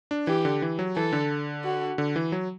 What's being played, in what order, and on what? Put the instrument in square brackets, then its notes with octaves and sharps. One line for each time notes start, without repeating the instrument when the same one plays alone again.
[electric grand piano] D4
[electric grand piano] E3 [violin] G4
[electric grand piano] D3
E3
F#3
[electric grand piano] E3 [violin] A4
[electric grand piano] D3
[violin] F#4
[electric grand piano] D3
E3
F#3